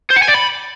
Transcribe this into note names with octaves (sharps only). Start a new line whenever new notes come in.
C5
F#5
G#5
D5
B5